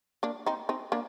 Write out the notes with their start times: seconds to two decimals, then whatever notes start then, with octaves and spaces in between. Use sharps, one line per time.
0.23 A#3 D4
0.46 C4 D#4
0.69 C4 D#4
0.92 A#3 D4